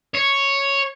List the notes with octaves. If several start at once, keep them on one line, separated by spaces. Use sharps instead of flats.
C#5